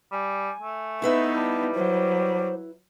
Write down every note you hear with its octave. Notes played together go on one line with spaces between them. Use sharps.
G3 G#5
A3
B3 D#4 E4 B4 E5
G3 A5
F#3 C5